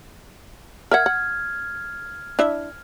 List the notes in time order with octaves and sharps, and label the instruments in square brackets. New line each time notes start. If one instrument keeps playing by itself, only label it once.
[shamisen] A#4 E5 F#5 [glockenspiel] F6 G#6
[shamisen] F#5
D4 E4 E5